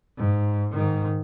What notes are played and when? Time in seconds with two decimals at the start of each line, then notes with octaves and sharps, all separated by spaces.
0.18 G#2
0.72 G#2 D#3